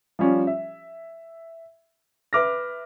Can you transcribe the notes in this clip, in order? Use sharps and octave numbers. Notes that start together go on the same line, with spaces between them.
F3 G3 C#4
E5
B4 E5 D6 F6 A#6